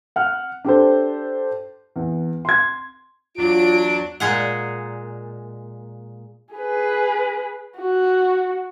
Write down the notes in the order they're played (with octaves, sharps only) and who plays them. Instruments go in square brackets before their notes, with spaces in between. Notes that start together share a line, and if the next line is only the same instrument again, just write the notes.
[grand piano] F#5 F6
D4 G4 A4 C5
E2
C6 G#6
[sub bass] E2 [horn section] F#3 D4 [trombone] F4 [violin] D7
[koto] A#2 G#3 G#4 F#5
[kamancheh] G#4 B4
F#4